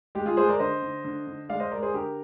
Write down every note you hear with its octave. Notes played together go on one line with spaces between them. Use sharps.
G#3 G4
F4 G#4
G#3 G#4 C5
A#4 D5
D3 C5 D#5
D3
D3
D3
G#3 D5 F5
C5 D#5
G#3 A#4 D5
G#4 C5
D3 G4 A#4